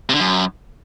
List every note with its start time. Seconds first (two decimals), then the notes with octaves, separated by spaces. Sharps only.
0.09 C3
0.15 D3
0.20 F#2